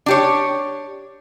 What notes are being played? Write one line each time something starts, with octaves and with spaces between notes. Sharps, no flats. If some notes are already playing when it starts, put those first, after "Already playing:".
D4 G4 C#5